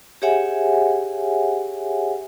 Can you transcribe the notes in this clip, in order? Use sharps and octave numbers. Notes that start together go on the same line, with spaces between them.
G4 G#4 C#5 E5 F#5 G#5